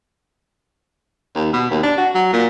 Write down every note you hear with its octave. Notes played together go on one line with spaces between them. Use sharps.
D#2
B2
D#2
D4
F#4
F#3
A#2